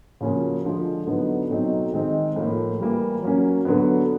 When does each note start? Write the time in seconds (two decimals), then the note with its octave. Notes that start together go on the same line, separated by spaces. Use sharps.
0.21 C#3 F3 A#3 C#4 F#4
0.64 D3 F3 G#3
1.07 D3 F#3 B3 D#4
1.50 B2 F#3 A3 C4 D#4
1.93 D#3 G#3 C4 D#4
2.36 A2 F3 A#3
2.79 E3 G3 A#3
3.22 F#3 A#3 C#4
3.65 D3 F#3 B3